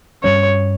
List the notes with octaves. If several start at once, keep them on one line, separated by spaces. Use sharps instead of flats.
G2 G3 C#4 C#5